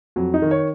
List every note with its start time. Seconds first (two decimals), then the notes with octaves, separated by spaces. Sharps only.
0.16 F2 F#3
0.34 D#4
0.42 D#3
0.51 C#5